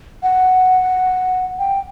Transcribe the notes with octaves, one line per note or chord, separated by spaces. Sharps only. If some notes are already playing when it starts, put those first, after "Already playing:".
F#5
G5